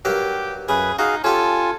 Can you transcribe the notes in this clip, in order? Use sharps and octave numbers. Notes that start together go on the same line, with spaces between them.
G2 F#3 G4 A#4
F#2 C#3 G#4 B4 B5
D#4 F#4 G#4 F5
C#4 F4 G4 A4 G#5